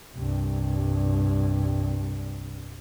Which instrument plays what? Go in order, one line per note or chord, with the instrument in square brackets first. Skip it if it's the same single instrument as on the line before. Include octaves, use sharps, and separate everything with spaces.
[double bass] C2 G2